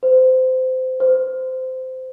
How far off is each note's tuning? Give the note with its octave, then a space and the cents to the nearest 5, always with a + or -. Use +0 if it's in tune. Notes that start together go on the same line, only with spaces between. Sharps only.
C5 -25
C5 -20